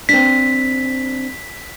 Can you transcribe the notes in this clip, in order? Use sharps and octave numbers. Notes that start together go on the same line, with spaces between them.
C4 D4 B6